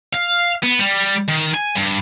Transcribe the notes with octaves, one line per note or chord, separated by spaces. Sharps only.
F5
B3
G3
D#3
G#5
G2